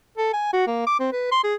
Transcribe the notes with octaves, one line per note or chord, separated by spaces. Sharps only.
A4
G#5
F#4
A#3
D6
C4
B4
C6
G#4